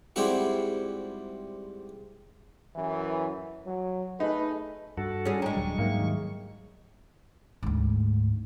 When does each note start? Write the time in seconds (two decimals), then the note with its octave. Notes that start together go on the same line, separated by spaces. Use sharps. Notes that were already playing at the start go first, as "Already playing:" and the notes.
0.16 G#2 G3 C4 E4 F#4 F#5
2.76 F#2 E3
3.65 F#3
4.20 A3 D#4 G#4 B4
4.98 G2 F#4 A4
5.25 G3 C#4 G#4
5.42 G3 G#3 D4 A#5 C#6
5.57 D#1 F#3
5.78 G#2 F#3 A#3 D#4 E5
5.99 D#2
7.63 D2 G#2